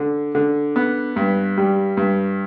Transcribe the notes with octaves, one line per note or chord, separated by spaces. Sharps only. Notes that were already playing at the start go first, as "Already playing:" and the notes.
Already playing: D3
D3
B3
G2
G3
G2